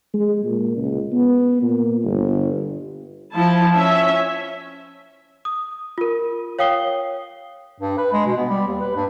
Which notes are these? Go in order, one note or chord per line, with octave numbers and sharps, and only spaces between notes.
G#3
A#2
C#2
B3
A#2
G1
F3 E4 A5
C#4 E5
D#6
F4 A#4
C#5 F5 G5 D#6 C7 G7
G2
B4
G#3
B2
B3
G3
D#2
B4
G2